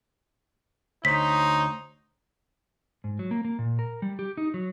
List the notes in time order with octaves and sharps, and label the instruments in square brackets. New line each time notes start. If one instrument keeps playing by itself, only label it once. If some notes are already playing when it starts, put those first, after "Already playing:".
[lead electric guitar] D2 [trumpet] D#4 [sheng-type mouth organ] C5 C#5 [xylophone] B6
[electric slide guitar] G#2
F#3
A#3
A#3
A#2
A#4
G3
G4
D#4
F#3